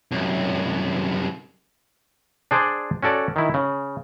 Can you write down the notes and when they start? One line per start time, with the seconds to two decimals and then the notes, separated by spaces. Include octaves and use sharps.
0.11 C2 F#2
2.51 D4 G#4 C5 D5
3.03 C#4 F#4 A4 D5
3.36 D#3 E4
3.54 C#3